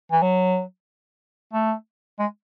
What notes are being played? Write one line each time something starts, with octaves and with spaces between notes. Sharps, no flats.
E3
F#3
A3
G#3